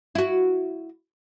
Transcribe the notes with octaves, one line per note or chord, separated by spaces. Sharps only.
E4 F#4